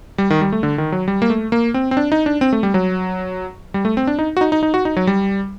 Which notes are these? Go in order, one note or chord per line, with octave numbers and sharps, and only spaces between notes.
G3
D#3
G3
A3
D3
D#3
F#3
G3
A#3
A3
A#3
C4
C4
D4
D#4
D4
C4
A3
G3
F#3
G3
A3
C4
D4
D#4
F#4
D#4
D#4
D#4
F#4
D#4
F#3
G3